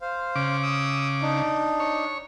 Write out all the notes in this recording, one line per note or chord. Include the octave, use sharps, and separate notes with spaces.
C5 F5
C#3 D6
D#6 E6
D4 D#4
C#5